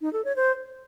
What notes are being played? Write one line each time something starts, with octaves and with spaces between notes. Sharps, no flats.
D#4
A4
C#5
C5